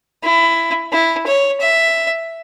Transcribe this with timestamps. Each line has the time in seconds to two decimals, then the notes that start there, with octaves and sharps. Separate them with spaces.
0.24 E4
0.92 E4
1.27 C#5
1.61 E5